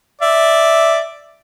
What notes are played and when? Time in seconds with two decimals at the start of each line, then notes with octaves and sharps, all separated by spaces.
0.22 D5 E5